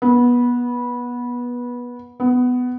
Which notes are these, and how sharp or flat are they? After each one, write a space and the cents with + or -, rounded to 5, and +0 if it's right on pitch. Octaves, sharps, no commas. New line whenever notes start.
B3 -20
B3 +10